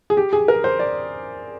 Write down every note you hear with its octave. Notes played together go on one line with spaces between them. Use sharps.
G#4
G4
G#4
A#4
C5
D5